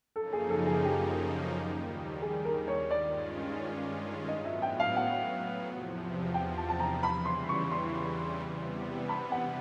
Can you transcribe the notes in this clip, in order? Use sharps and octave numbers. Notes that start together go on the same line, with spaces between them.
F#2 C#3 F3 A#3 D#4 A4
G#4
A4
G#4
G4
D#2 D#3 G3
G#4
A#4
C#5
G2 D#3 G#3 C#4 F4 D5
A2 F#3 B3 D#5
E5
G5
F5
F#5
E2 C3 F3
G5
A5
A5
A#5
E2 C#3 E3 G3 B5
C6
C#6
C6
C3 E3 G3 B3
B5
F#5